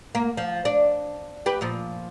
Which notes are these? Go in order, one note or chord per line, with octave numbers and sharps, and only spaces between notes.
A#3
F3
D4
G4 B4
A#2 F3